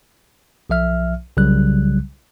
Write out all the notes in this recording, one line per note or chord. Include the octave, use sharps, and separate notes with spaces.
B1 F3 E5 F6
C2 C#3 F#3 G3 F#6